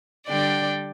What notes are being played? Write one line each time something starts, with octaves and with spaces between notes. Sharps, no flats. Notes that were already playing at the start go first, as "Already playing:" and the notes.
D3 G3 D4 D5 G5